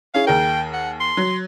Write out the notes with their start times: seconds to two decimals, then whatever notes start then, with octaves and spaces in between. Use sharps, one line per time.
0.14 C#4 E4 G#4 F5
0.27 D#2 G#4 A#4 G5
0.74 F#5
1.01 C6
1.17 F#3